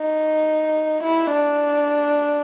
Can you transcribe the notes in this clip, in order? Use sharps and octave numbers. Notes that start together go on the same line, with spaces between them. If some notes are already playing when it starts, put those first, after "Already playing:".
Already playing: D#4
E4
D4